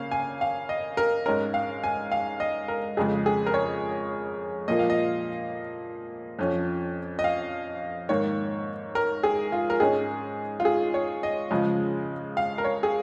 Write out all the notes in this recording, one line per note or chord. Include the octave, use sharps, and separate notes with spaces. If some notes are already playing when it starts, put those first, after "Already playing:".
Already playing: C#3 A#3 C#4 F5
G#5
F5
D#5
A#4
G#2 G#3 C#4 A#4
F5
G#5
F5
D#5
A#4
F2 C#3 G#3 G#4
G#4
A#4
C#5
A#2 F3 A#3 D#5
F5
D#5
F2 F3 C#4
D#5
F5
G#2 D#3 A#3 C#5
A#4
G#4
F4
A#4
G#2 G#3 C#4 G#4
F4
G#4
C#5
D#5
C#3 F3 G#3
F5
A#4
C#5
G#4